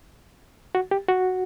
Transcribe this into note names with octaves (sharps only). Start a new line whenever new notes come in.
F#4
G4
F#4